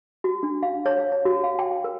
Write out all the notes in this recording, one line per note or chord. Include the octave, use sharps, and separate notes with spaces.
F#4
D4
F5
C#5
F5
C#5
F#4
F5
G5
A#4